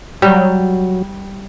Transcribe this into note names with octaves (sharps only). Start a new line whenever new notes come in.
F#3 G3